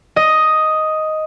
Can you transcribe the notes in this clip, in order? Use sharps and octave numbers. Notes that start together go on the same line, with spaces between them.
D#5